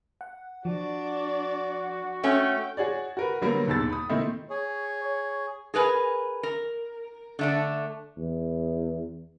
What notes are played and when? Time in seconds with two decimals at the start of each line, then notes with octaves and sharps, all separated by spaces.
0.21 F#5
0.65 F3 D4 F#4 D5
2.24 A3 C#4 G5
2.77 F#4 G#4 C#5 D5
3.17 F#4 A#4 B4
3.42 D3 F#3 G3 A#3 B3 A#4
3.67 D#1 D#2 G#2 B2 E6 A6
3.89 B5 D#6
4.09 A#2 D#3 A3 C4 D#4 E4
4.50 G#4 C#5
5.04 C#5
5.74 G#4 A#4 B4 G#5
6.43 A#4
7.39 D3 A3 D4
8.17 E2